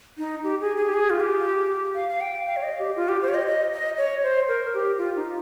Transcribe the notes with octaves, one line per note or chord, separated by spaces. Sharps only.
D#4
G4
G#4
G#4
G4
G#4
F4
G4
F5
F5
G5
F5
C#5
D#5
G4
F4
G4
C5
C#5
D#5
D#5
D#5
C#5
C5
A#4
G4
F4
D#4